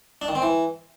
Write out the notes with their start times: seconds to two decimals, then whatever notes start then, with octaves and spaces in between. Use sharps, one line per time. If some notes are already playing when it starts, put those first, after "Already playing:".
0.22 D4
0.28 D#3
0.35 C4
0.42 E3